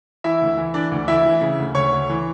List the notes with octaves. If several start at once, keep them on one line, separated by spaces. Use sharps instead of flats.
E3 E4 E5
D2
E3
E3 D4 D5
D2
E3 E4 E5
E3
C#3
D2
D2 C#5 C#6
D2
E3